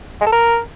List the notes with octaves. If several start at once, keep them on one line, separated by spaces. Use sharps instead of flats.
G#3
A4
A#4